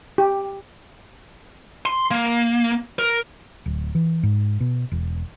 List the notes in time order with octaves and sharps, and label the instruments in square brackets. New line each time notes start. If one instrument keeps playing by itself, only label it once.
[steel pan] G4
[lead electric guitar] C6
A#3
A#4
[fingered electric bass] D1
E3
G#2
B2
E1